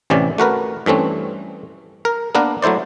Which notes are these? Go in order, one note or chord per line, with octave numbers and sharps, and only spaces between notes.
A1 C3 E3 C#4 D5
A3 F#4 A#4 B4
G2 E3 A3 C4 C#4
A#4
A#3 B3 D4 A#4 B4
F#3 A3 E4 C5 D5